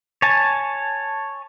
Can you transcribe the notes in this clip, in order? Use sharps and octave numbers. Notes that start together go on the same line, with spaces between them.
C#5 G#5 A5